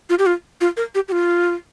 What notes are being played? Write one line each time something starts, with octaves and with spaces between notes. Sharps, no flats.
F4
G4
F4
F4
A#4
G4
G4
F4